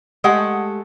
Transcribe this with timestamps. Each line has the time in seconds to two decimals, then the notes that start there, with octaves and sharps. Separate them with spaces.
0.24 G#3 A3 G4 F#5